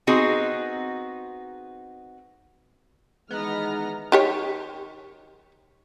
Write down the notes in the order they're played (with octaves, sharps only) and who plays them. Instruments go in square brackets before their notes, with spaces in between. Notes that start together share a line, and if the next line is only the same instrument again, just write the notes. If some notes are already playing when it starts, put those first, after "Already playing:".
[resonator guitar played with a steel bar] B3 C4 D#4 F#4 G#4
[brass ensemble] D#3 E3 D#4 [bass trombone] G#3 [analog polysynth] B3 [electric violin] A#5 F6
[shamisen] D#3 G4 C#5